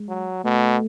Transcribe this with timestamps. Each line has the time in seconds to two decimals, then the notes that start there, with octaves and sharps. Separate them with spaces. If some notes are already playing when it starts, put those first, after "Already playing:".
Already playing: G#3
0.08 F#3
0.44 B2 A3